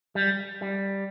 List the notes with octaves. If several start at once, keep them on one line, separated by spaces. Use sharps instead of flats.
G3
G3